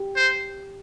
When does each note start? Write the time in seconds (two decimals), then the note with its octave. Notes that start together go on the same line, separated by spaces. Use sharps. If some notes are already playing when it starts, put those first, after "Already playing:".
Already playing: G4
0.16 C5